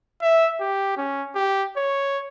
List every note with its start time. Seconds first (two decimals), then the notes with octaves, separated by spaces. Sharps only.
0.22 E5
0.60 G4
0.97 C#4
1.35 G4
1.77 C#5